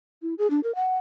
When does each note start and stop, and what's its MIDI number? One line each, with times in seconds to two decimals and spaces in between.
0.22 0.34 64
0.38 0.49 68
0.50 0.60 62
0.64 0.74 70
0.75 0.98 78